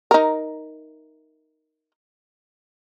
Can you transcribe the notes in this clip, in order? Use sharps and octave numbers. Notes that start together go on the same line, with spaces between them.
D#4 A#4